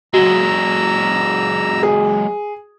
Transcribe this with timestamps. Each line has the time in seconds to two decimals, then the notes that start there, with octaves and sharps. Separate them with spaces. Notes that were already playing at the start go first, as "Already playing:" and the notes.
0.14 F#3 G#3 F#4 A#5 E6
1.83 G#4